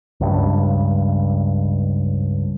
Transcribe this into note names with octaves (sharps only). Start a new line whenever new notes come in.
C#2 G2